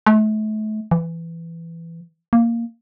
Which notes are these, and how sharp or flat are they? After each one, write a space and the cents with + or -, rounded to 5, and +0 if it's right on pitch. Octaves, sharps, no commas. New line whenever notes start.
A3 -35
E3 +15
A#3 -5